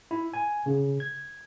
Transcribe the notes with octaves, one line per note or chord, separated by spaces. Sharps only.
E4
G#5
C#3
G#6